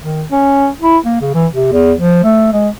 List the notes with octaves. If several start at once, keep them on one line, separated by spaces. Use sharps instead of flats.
D#3
C#4
E4
A#3
C#3
E3
C3
E2
F3
A3
G#3